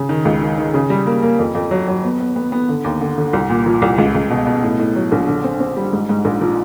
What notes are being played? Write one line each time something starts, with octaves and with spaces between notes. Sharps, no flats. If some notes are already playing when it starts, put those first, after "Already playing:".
Already playing: C#3
D#3
C#2
D#3
D#3
C#3
G3
A#3
A#3
F2
F2
F#3
F#3
B3
B3
B3
B3
D3
D#2
D3
D3
C2
A#2
F3
C2
C#2
C#2
B2
B2
A2
A2
F#3
A#1
D3
C4
C4
G3
G#2
G#2
A#1
F3